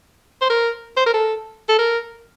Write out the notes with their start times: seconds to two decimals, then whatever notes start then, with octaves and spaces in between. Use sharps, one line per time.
0.41 C5
0.50 A#4
0.97 C5
1.06 A#4
1.14 A4
1.69 A4
1.79 A#4